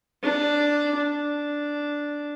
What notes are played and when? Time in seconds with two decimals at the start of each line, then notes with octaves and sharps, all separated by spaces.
0.23 D4
0.97 D4